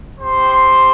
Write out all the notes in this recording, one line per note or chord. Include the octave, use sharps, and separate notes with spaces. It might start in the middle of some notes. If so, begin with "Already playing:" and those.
C4 G4 C5 C6